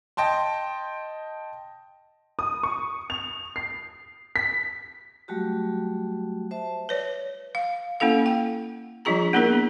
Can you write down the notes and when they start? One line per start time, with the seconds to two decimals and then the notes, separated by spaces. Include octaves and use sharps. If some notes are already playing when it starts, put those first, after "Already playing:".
0.17 D#5 G5 A5 C6
2.39 D#6
2.63 C#6
3.10 F7
3.56 C7
4.36 B6
5.28 F#3 G3 A3 F#4 G4
6.51 C5 E5 A5
6.89 B4 C#5 D5
7.55 F5
8.00 A#3 C#4 E4 A4 F5
8.26 G5
9.05 F3 G3 D4 F4 G#4 A#5
9.33 A#3 B3 D4 E4 G#4 A#4